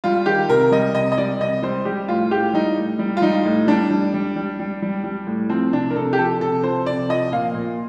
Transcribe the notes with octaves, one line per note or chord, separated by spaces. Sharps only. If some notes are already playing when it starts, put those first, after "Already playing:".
G3 F4
D#3 G4
C3 A#4
G3 D#5
C3 D#5
D#5
G3 D5
C3 D#5
G3 C5
G3 G4
A2 F4
A2 G4
G3 D#4
A2
G3
F4
G3 D#4
A2
G3 D4
G3
G3
G3
G3
G3
G3
A2
F3 C4
C3 D4
A#4
C3 A4
G4
F3 A4
C3 A4
F3 C5
C3 D5
F3 D#5
A#2 F5
A#2